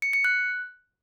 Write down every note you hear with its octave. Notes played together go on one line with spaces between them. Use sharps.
C#7
C#7
F#6